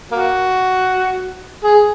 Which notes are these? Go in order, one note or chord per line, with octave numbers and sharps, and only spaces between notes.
A#3 F#4
G#4